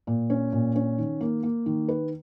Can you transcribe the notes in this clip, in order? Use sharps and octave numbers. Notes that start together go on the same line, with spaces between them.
A#2
C#4
A#2
C#4
D#3
A#3
A#3
D#3
B4